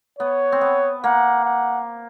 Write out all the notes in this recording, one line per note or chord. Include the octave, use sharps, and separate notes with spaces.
B3 C#5
C4
B3
A#3 F#5
F#5